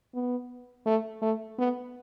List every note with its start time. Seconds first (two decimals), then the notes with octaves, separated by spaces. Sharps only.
0.14 B3
0.86 A3
1.22 A3
1.58 B3